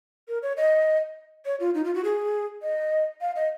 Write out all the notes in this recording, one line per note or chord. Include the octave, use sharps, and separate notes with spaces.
A#4
C#5
D#5
C#5
F4
D#4
F4
F#4
G#4
D#5
F5
D#5